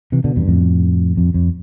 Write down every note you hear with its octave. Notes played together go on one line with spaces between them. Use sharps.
C3 E3
B2 D3
E2 G2
F2 A2
F2
F2